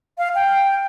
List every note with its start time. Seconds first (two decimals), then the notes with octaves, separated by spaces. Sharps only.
0.18 F5
0.35 G5